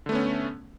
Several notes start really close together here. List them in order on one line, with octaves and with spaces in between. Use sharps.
D3 A3 B3 C#4